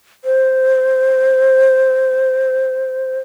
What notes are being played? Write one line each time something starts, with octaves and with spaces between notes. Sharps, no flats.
C5